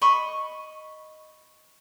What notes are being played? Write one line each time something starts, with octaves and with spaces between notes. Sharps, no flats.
D#5 B5 C#6